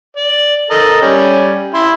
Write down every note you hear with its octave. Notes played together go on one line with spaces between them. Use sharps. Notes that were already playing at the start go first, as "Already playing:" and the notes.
D5
A4 A#4 D#5
G3 C#4
E4 C6